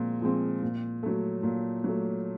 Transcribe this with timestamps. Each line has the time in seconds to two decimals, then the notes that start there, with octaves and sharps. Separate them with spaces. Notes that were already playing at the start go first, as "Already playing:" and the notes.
Already playing: A#2 F3 G#3 C4
0.22 F3 G#3 C4
0.62 A#2
1.03 F#3 A3
1.43 A#2
1.84 F#3 A3